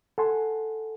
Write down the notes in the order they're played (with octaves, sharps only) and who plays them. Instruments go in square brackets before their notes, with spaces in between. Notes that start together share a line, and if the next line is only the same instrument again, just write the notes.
[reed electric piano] A4 F#5 G#5 C6